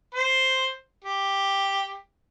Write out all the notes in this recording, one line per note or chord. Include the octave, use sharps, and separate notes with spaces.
C5
G4